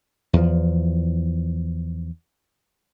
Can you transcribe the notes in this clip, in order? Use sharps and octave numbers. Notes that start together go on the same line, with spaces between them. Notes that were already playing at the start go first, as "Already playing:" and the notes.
E2 F3